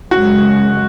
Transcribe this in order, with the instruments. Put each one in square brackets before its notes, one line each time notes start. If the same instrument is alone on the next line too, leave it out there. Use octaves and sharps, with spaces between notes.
[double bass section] F#2 C#3 G#3 [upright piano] F#4